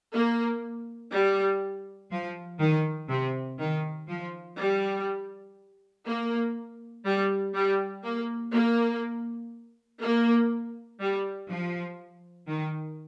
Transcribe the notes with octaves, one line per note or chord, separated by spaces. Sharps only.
A#3
G3
F3
D#3
C3
D#3
F3
G3
A#3
G3
G3
A#3
A#3
A#3
G3
F3
D#3